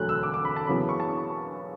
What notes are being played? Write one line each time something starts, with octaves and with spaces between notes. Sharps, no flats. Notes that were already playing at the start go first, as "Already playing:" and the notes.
Already playing: E1 D2 D3 F#3 A3 F#6
E6
D6
D6
B5
A5
F#2 C#3 E3 B3 B5
C#6
A5